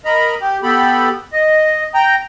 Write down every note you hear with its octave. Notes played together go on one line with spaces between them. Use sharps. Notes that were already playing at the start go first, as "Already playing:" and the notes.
A#4 D#5 A#5 B5
G4
B3 G4 A4 B5
D#5
G5 A#5